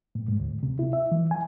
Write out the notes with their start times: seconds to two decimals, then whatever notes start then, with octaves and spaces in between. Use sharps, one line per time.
0.15 A2
0.28 G#2
0.40 D2
0.63 C3
0.79 E4
0.93 E5
1.12 E3
1.31 G#5